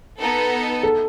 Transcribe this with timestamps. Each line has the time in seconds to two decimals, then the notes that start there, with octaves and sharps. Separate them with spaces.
0.18 B3 D#4 A4
0.83 A4